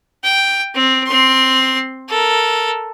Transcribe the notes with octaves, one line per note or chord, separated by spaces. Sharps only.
G5
C4
C4 C6
A4 A#4